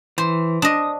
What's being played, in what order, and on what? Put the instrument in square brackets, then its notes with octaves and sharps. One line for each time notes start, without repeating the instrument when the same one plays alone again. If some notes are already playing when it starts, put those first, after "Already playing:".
[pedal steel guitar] E3 [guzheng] C5
[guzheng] D4 D#5 [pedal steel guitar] D#6